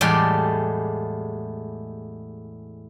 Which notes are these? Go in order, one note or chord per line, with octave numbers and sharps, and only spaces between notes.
E2 A2 G3 G#3 D5 C6